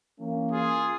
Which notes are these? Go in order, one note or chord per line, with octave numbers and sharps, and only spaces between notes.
E3 A#3 C#4
F4 G#4